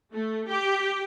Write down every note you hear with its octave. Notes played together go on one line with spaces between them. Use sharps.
A3
G4